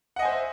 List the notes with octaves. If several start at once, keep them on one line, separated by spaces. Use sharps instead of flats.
C5 D#5 E5 F#5 G#5